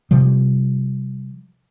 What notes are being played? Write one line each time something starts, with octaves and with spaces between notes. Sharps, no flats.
C3 F3 G3